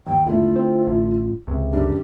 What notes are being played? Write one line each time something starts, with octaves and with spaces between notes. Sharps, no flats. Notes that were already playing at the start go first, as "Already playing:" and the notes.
D#2 G5
E1 D3 A3 E4 F4
C4
A1
C#2 C3
F#2 D3 D4 G4